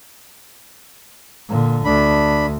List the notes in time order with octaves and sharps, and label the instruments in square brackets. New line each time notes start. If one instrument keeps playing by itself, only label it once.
[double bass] A#2 D3
[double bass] D2 [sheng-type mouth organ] D4 B5